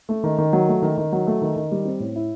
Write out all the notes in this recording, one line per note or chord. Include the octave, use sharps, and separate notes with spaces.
A3
D#3
D#3
F#3
A3
D#3
D#3
F#3
A3
D#3
D#3
G3
C4
A2
E4